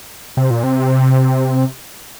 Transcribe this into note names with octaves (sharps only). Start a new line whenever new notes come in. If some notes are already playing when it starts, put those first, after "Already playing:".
C3
A#2
C3